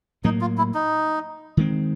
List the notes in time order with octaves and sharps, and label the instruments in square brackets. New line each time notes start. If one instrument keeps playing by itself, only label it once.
[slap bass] A2 F#3 A#3 [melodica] D#4
[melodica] F4
E4
D#4
[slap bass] D#3 G#3 C4